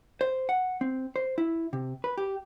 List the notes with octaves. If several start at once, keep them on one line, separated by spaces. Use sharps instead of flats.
C5
F#5
C4
C5
E4
C3
B4
G4